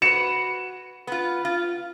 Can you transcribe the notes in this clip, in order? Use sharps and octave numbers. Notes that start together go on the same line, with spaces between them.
F#4 B4 C#7 E7
B3 F4
F4